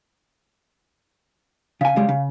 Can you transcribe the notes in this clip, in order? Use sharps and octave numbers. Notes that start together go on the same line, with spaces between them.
C#3 F5 G#5
C#3 G3 G#3
C#3